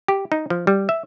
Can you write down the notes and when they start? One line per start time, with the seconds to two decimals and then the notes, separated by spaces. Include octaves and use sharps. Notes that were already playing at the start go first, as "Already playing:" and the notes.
0.08 G4
0.32 D#4
0.50 F3
0.67 G3
0.89 E5